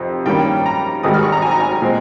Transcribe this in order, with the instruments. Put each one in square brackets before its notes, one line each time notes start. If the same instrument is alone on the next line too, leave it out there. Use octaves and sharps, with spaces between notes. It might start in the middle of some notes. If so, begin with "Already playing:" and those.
Already playing: [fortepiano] F2 C3 D#3
G2 D#3 G3 A#3 C#4 G5
A#5
G#1 G#2 D#3 G3 D#6
F6
C#6
A#5
G#5
A#5
G#5
A#2 G#3 C4